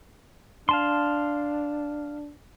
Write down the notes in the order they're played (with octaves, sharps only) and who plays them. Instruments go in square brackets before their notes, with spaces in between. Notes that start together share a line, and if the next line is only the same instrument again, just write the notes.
[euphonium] D4 [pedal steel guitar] F5 A5 C6